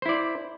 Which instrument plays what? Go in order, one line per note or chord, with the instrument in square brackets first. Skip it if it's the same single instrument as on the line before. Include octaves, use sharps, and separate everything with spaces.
[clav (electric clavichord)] C5
E4
D5